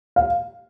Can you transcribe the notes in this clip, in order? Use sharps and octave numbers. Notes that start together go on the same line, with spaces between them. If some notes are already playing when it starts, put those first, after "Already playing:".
F5